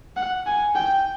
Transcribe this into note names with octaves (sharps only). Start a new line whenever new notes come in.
F#5
G#5
G5